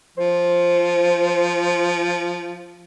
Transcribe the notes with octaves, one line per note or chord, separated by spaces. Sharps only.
F3 C5